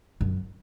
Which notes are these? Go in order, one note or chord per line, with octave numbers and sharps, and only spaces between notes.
F#2